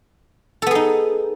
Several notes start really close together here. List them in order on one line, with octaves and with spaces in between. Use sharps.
A4 B3 G#4 D#4